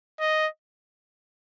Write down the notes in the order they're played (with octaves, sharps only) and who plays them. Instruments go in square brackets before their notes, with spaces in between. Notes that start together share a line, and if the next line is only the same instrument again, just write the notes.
[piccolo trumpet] D#5